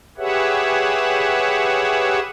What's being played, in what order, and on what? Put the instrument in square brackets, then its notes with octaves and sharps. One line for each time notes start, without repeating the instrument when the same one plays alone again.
[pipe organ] G4 G#4 B4 C#5 E5 F#5